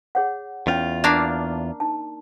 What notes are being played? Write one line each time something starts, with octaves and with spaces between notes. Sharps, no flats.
G#4 C#5 F#5
E2 C#4 F4 C#5 G5
A#3 D4 F5 A5 C#6 D6
D#4 A5